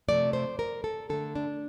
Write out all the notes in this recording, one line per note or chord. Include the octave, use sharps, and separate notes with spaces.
C3 F3 A3 D5
C5
A#4
A4
D3 A3 A4
D4